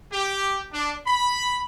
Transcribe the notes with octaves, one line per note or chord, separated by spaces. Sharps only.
G4
D4
B5